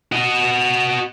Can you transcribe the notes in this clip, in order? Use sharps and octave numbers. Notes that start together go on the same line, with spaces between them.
F#4 D#5